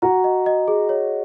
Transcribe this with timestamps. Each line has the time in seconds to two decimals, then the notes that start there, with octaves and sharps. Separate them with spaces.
0.02 F#4 A#5
0.24 D#5
0.46 D#5
0.68 G#4
0.89 C#5